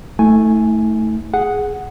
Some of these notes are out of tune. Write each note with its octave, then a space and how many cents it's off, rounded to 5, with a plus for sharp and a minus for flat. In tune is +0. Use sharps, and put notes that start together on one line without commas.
A3 +0 E4 -45 G#5 +0
G#4 +0 F#5 +0